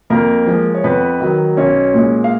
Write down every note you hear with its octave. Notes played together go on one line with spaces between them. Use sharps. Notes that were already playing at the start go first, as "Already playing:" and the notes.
F2 A#3 A#4
F3 G#3
C#5
F2 B3 B4
D#3 F#3
B1 C#4 C#5
A#2 G#3
F5